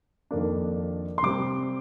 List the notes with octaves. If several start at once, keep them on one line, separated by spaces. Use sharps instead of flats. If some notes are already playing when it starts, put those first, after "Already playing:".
F2 D#3 A#3 D4
C6
C3 G3 C4 D6